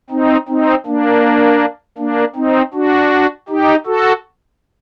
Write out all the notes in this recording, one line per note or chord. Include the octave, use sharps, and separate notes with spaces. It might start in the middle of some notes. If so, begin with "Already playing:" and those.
C4 D#4
C4 D#4
A#3 D4
A#3 D4
C4 D#4
D4 F#4
D#4 G4
F#4 A4